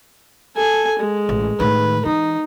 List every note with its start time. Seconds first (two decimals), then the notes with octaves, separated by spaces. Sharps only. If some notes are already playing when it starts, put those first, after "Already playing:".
0.56 A4 G#5
0.99 G#3
1.29 A1
1.60 A2 D#3 B4
2.05 E3 D#4